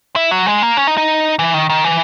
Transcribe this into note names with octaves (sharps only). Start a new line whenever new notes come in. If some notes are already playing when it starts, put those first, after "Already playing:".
E4
F#3
G#3
A#3
C#4
D#4
D#4
E3
D#3
D#3
E3